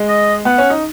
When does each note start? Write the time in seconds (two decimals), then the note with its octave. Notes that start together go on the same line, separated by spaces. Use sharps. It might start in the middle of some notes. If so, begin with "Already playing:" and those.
Already playing: G#3
0.08 D#5
0.45 B3 F#5
0.58 C#4
0.70 D#4